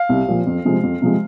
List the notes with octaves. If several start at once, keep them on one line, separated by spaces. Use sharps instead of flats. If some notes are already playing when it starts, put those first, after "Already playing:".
Already playing: F5
C2
A#2 F3
F2
C3 F3 G#3
F2
C3 F3 G#3